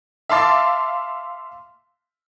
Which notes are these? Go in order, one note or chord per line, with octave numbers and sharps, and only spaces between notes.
E5 F5 A5 C6 D6 A6